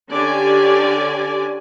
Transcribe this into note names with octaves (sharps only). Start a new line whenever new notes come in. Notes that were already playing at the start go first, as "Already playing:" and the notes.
D3 C#4 G4 D5 G#5